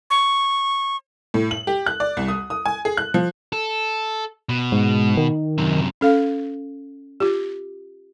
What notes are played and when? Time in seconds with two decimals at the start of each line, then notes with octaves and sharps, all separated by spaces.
0.10 C#6
1.34 A2
1.51 F#7
1.67 G4
1.86 F#6
2.00 D5
2.17 C2
2.28 D#6
2.50 D#6
2.66 G#5
2.85 G#4
2.97 F#6
3.14 F3
3.53 A4
4.49 B2
4.72 G#2
5.17 D#3
5.58 F#2 C3
6.01 C#4 A4 F5
7.20 F4 G4